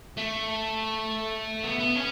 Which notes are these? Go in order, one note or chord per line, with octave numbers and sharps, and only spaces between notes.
A3
B3
B3
C#4